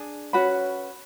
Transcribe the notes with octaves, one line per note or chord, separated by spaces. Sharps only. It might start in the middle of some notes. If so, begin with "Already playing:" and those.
Already playing: D4 G#4
C#4 F#4 B4 B5